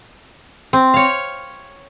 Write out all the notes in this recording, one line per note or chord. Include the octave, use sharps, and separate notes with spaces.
C4
C#5 F5